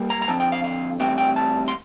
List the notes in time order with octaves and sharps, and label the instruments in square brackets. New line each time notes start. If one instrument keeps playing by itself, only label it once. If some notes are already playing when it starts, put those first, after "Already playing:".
Already playing: [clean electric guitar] G3 A#3
A#5
A#5
F2 D3 F3 C4 A5
G5
F5
F5
A2 E3 G3 C4 G5
G5
A5
C6